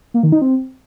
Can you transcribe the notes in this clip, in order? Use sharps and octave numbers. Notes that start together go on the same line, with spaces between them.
A#3
D#3
D#4
C4